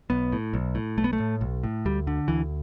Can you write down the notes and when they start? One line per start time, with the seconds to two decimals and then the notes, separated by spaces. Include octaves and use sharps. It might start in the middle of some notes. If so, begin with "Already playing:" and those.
0.10 B1 B3
0.32 A2
0.54 B1
0.75 A2
0.97 B1 A3
1.04 B3
1.13 A3
1.20 A2
1.41 B1
1.64 A2
1.85 D2 G3
2.07 D3
2.28 D2 E3